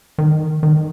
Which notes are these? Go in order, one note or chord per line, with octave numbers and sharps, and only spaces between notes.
D#3
D#3